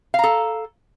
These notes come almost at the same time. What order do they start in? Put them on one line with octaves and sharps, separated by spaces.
F5 A#5 A4